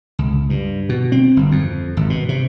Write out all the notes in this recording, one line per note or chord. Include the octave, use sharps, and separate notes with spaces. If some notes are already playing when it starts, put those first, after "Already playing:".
C#2
G2
B2
C4
G1
F2
G#1
B2
C3